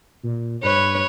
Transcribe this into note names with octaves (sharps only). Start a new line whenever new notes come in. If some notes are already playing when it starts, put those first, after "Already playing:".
A#2
G2 B4 C#5